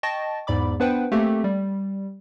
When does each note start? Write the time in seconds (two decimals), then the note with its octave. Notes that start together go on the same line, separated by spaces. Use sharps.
0.03 D#5 G5 A5 C#6 A6 A#6
0.47 E2 G#2 D5 B5 D6
0.80 B3 D4 B4 C5 F#5 G5
1.12 A3 A#3 C4 G4 A4
1.44 G3